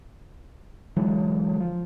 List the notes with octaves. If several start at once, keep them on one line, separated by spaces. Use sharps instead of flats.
D3 E3 F#3 G#3
F3